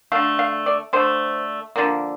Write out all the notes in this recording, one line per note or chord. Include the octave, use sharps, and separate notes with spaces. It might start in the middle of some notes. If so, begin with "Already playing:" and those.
D3 A3 F5
F5
D5
D3 A3 C5
D3 F3 A#3